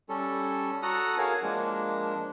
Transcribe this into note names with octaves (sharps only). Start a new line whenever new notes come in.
G3 C#4 A4
F#4 A4 F#5 A#5 D#6
F#4 G#4 A#4 C#5 F5 G#5
F3 G#3 A#3 D4